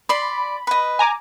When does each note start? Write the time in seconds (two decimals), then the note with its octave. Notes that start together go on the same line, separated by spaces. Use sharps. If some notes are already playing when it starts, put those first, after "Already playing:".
0.09 D5 B5 C6
0.67 B4 D#5
0.99 G#5 A#5 D6